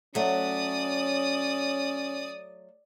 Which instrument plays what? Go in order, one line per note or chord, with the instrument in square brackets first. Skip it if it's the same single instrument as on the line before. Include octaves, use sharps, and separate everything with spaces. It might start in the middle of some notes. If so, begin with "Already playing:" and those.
[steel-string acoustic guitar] F#3 A3 [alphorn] C#4 [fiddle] D5 D#6